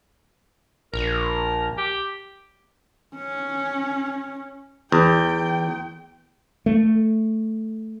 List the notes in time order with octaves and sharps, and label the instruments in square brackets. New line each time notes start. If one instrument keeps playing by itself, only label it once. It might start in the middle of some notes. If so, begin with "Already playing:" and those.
[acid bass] A#1 [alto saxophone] A#4
[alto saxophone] G4
[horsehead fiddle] C#4
[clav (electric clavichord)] E2 [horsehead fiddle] G5
[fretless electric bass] A3